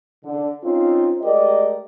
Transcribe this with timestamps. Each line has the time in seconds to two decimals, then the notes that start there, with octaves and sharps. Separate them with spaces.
0.24 D3
0.63 C4 C#4 D#4 F4
1.22 G#3 A3 G4 A#4 D5 D#5